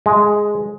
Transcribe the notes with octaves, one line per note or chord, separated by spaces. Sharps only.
G#3